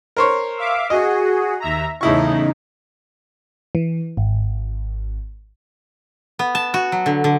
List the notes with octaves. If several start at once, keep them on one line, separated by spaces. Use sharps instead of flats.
A#4 C5 C#5
E5 F5 D6
F#4 G#4 D#5
D#2 E5 A#5
E2 A2 C#3 D#4 E4 C#6
E3
G#1
B3
A5
F#4
F#3
D3
D3